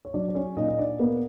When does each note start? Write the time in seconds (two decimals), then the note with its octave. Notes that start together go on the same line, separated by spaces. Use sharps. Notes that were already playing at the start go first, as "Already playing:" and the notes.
0.05 C#5
0.14 F#3 D4 D5
0.28 D5
0.35 C#4 C#5
0.57 A#2 D#4 D#5
0.68 D#5
0.79 D4 D5
0.99 A#3 B3 B4